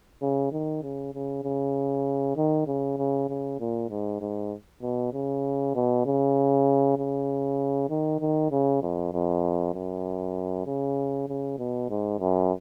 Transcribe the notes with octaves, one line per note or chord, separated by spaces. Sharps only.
C#3
D#3
C#3
C#3
C#3
D#3
C#3
C#3
C#3
A#2
G#2
G#2
B2
C#3
B2
C#3
C#3
D#3
D#3
C#3
F2
F2
F#2
C#3
C#3
B2
G#2
F#2